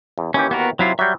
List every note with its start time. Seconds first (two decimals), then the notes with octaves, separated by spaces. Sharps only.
0.18 E2
0.34 D#2 E3 C#4 G4
0.51 B3 F#4 A#4
0.79 C3 F#3 E4 F4
0.99 F#3 G3 E5 G6